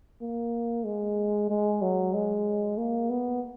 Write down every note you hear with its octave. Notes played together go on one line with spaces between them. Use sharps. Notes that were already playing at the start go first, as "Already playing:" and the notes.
A#3
G#3
G#3
F#3
G#3
A#3
B3